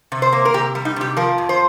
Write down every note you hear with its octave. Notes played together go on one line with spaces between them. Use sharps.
C3
C5
A#3
A#4
C3 G4
G3
D#4
C3 G4
F3 A#4
F2
C5